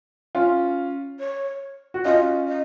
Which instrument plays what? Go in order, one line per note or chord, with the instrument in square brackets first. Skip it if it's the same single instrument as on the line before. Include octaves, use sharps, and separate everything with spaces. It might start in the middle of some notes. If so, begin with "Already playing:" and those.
[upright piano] C#4 F4
[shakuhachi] C#5
[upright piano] F#4
[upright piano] C#4 F4 [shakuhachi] D#5
[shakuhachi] D#5